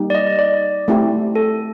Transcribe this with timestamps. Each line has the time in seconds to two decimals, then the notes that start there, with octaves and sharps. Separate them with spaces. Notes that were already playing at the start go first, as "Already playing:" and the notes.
Already playing: G3 A#3 D#4 G4
0.10 D5
0.15 D#5
0.39 D5
0.88 A3 C4 E4 G4
1.35 A4